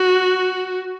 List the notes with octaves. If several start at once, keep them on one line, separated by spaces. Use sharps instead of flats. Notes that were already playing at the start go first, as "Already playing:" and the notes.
Already playing: F#4